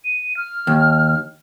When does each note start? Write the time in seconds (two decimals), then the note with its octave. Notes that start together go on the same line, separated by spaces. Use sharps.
0.05 D#7
0.37 F6
0.67 D#2